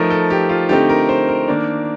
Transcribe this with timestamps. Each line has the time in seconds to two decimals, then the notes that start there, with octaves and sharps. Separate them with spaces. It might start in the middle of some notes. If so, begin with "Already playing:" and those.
Already playing: F3 A3 D#4 A#4
0.10 A4
0.30 G4
0.49 F4
0.69 D3 A3 C4 D#4 G4
0.89 A#4
1.09 C5
1.29 A#4
1.48 D#3 A#3 D4